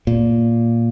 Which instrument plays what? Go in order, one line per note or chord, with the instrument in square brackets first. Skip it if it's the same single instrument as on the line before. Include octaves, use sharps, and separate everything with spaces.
[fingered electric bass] A#2